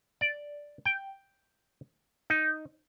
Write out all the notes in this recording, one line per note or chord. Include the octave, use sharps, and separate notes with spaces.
D5
G5
D#4